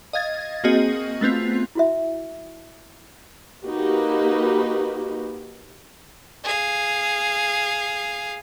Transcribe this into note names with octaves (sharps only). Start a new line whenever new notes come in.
D#5 F5 G#6 A6
A#3 C4 F#4 G#4 D#5
A3 B3 C4 F4
E4 F#4 E5
A#3 D#4 F#4 G4 B4
G#4 F5